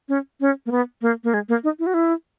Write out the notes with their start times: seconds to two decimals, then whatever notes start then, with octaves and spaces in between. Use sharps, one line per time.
0.09 C#4
0.41 C#4
0.66 A#3
0.71 B3
1.02 A#3
1.24 A#3
1.34 G#3
1.49 A#3
1.64 D#4
1.79 E4
1.87 F#4
1.94 E4